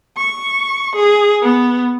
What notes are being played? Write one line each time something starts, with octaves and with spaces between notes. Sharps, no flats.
C#6
G#4
B3